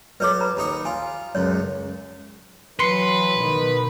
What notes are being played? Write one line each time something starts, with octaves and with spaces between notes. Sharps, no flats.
F#3 A4 B4 C#5 D6
B4 A#5 B5
D#2 D#4 C#6
F4 G#5
C#2 F#2 C#5
E3 F#3 B4 C6 C7 C#7
B2 D#3